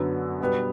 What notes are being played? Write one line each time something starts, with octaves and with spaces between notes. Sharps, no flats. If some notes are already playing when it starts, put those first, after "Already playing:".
Already playing: F#2 D3 F#3 B3
B2 G3 B3